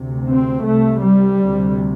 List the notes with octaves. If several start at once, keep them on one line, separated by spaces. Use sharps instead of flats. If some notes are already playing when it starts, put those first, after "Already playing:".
Already playing: D2 C3
C4
C2 C3 A3
G3
D2 C3